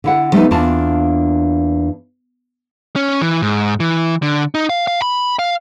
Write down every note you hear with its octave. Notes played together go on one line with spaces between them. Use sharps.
D3 E4 F#5
F3 G3 A3 B3 C4 D#4
E2 A#3 D4 F4 A5
C#4
E3
G#2
E3
D3
D#4
F5
F5
B5
F5